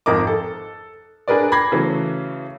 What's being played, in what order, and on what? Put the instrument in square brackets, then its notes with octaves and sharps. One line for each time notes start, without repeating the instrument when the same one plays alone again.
[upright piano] G#1 F2 A#4 D#5 D6
A4
D4 G#4 A#4 B4 D5
B5 D6 G#6 A#6 C7
C#3 E3 F#3 A3